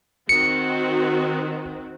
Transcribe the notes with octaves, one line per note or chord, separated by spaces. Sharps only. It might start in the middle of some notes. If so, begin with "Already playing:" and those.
D#3 C4 F#4 C#7